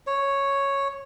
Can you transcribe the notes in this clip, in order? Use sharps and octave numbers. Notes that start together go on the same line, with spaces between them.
C#5